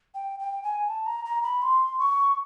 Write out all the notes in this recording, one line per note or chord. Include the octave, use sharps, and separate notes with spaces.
G5
G5
G#5
A5
A#5
A#5
B5
C6
C#6